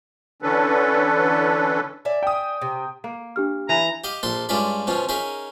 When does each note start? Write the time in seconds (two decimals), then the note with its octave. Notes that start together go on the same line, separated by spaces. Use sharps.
0.42 D3 E3 C#4 D4 A4 B4
2.05 D5 E5 G#5
2.23 G5 D#6
2.61 C3
3.04 A#3
3.36 D4 G4 F6
3.69 E3 E4 A#5
4.04 G4 D#5 F5
4.23 A#1 A#2 A4 C6
4.49 G2 G#3 C#4 F4 D5 B5
4.87 B2 F3 C#4 F4
5.09 C#4 D#4 G#4 A#4 E5 G#5